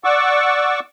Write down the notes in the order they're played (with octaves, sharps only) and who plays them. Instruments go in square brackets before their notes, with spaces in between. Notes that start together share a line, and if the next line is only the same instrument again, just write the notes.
[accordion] D5 F#5 C#6 D6 E6